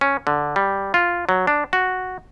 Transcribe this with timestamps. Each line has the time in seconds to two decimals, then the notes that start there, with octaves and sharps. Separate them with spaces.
0.01 C#4
0.27 D3
0.56 G3
0.94 F4
1.29 F#3
1.47 D4
1.73 F#4